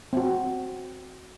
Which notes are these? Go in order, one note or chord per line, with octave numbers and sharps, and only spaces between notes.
C4 F#4